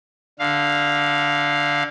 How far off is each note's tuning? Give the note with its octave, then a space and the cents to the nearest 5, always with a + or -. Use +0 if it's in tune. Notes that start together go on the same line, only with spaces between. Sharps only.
D3 +0 F5 +0